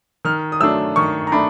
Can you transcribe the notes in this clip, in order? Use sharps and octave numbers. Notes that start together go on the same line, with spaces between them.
D#3 F6
D#6
F#3 A3 D4 E6
D#3 C#6
A#5
A3 D4 B5